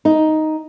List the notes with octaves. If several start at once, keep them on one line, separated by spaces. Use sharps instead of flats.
D#4